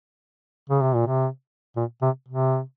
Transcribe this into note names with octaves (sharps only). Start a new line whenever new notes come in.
C#3
C3
A#2
C3
A#2
C3
C3